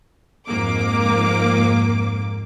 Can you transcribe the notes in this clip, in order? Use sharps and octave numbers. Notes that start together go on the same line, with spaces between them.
F2 G#2 A#3 D6